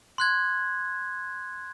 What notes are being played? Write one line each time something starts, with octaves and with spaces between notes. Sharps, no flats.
C6 F#6 G#6